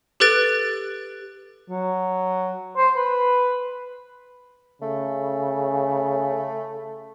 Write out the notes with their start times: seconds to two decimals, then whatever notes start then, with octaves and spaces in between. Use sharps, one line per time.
0.20 G4 A4 B4 F#6 A6 D7
1.70 F#3
2.77 C5
2.96 B4
4.82 C#3 A3